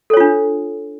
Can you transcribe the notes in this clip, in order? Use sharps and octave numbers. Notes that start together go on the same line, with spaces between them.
D4 F4 A4 C#5